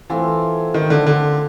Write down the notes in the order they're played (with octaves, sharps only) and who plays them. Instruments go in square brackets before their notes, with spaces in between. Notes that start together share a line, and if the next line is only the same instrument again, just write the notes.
[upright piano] E3 [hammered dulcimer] A3 C4 F4
[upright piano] D#3
D3
D3